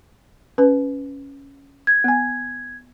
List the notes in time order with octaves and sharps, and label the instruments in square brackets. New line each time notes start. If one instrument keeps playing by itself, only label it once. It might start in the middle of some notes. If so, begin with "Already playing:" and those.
[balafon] C#4 B4
[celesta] G#6
[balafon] B3 G#5